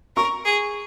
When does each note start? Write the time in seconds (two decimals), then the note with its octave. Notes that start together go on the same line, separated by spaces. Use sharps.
0.16 A#4 C#6
0.45 G#4